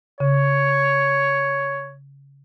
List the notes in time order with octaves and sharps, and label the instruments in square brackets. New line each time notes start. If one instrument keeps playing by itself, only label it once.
[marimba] C#3 [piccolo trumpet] C#5